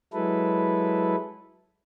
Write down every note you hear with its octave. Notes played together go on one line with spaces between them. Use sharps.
F#3 G#3 E4 A4 B4